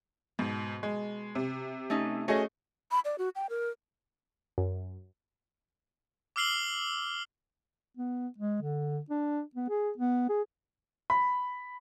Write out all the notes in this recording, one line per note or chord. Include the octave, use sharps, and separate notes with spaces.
G#2 B2
G#3
C3
A3 C#4 D#4
A3 C#4 F#4 G#4 D#5
B5
D5
F#4
G5
A#4
F#2
D6 E6 F6 C7 F#7 G7
B3
G#3
D3
D4
B3
G#4
B3
G#4
B5